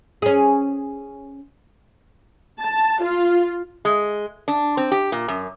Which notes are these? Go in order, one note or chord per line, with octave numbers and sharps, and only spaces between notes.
C#4 G#4
A5
F4
G#3
D4
C4
G4
A#2
F#2